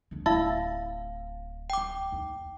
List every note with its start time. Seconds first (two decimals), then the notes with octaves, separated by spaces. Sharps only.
0.11 D2 D3
0.26 D1 E4 F5 A5
1.70 G5 D6
2.12 D#2